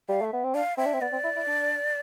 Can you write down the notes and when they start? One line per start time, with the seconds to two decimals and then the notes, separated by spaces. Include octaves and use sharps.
0.09 G3 F5
0.21 A3 E5
0.33 B3
0.44 C4
0.54 D4 F5
0.77 C4 E5
0.86 D4
0.94 C4
1.01 B3 D5
1.12 C4
1.24 E4
1.36 E4
1.47 D4